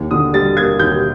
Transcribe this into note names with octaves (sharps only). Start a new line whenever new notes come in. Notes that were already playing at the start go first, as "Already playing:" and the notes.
Already playing: D#2
D3 D#6
G3 A6
A#3 G#6
D#2 G6